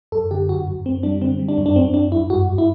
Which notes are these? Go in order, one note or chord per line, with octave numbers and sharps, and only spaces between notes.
F#2 A4
D3 G4
F#2 F#4
F#2
F#2 C4
G3 D4
D3 C4
G3
D4
F#2
D4
F#2 C4
F#2 D4
F#2 E4
G2 F#4
G2
E4